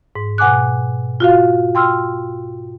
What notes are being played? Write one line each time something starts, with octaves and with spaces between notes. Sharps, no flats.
G#2
B2 F#5 G#5 D6 F#6
F4 F#4 F5
G5 C6 E6 F6